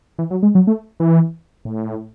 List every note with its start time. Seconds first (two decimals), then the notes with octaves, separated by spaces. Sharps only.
0.18 E3
0.31 F#3
0.43 G#3
0.55 F#3
0.67 A3
1.00 E3
1.65 A2